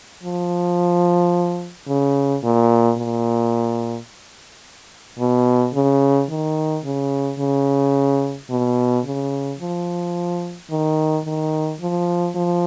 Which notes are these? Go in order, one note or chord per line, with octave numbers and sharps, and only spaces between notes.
F3
C#3
A#2
A#2
B2
C#3
D#3
C#3
C#3
B2
C#3
F3
D#3
D#3
F3
F3